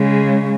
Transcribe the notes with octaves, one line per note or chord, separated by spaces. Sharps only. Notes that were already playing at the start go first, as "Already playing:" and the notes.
Already playing: C#3 G#3